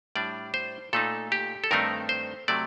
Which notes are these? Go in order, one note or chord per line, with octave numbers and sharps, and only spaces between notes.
A2 G3 D4 D5
C5
A#2 A3 D#4 A4
G4
A4
G2 D#3 A3 C4 D#4 A#4
C5
C3 F#3 A3 D5